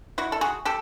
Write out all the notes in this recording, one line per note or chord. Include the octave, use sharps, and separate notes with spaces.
E4 F#4
A4
F#4 G#4
G4 A4